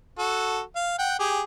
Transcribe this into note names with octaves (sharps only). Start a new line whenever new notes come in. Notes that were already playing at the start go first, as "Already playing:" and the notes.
F#4 A4
F5
F#5 G5
G4 G#4